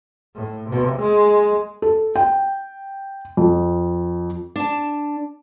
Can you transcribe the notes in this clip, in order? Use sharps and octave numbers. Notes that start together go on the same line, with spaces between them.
A2
C3
G#3
A4
G5
F2
D4 A5